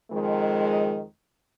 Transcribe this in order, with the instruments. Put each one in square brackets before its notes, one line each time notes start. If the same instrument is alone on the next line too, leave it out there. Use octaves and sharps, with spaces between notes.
[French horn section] F2 D#3 G#3